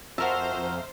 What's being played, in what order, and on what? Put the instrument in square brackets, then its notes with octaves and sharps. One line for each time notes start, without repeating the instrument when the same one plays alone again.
[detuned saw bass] F2 [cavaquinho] F#4 A#4 A5 [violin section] C5 [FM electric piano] E5 A#5 F6